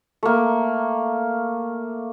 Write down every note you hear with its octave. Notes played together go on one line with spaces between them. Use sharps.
A3 A#3